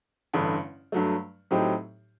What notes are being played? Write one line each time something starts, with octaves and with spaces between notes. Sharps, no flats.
A1 G2 D3
G2 F#3 A3
A2 F#3 C4 D#4 G4